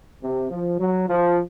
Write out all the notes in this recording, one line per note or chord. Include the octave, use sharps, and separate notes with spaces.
C3
F3
F#3
F3